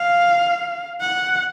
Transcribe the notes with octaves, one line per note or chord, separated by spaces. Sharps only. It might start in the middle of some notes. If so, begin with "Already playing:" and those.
Already playing: F5
F#5